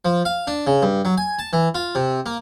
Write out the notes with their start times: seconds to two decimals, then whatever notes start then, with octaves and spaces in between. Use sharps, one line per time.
0.05 F3
0.25 F5
0.47 D4
0.67 C#3
0.82 G2
1.05 F#3
1.18 G#5
1.39 A5
1.53 E3
1.75 F4
1.95 C3
2.26 A#3